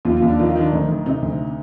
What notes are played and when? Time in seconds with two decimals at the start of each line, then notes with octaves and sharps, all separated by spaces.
0.05 D#2 F4
0.17 F4
0.22 D#2
0.28 D4
0.39 D#3 F4
0.50 F4
0.56 D#3
0.61 D4
0.72 D2 D#4
0.89 D#3
1.06 C3 D#4
1.22 D2